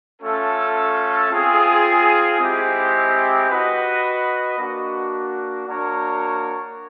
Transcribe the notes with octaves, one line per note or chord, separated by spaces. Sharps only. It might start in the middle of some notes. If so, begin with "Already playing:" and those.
A3 C#4 F4 A4
C4 F4 G#4
G#3 C4 E4 G4
F#4 B4 D#5 F#5
A#3 D4 F#4
A#3 D4 F#4 A#4 C#5